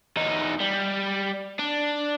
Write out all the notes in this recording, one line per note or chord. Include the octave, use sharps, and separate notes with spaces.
E2 D#4
G3
D4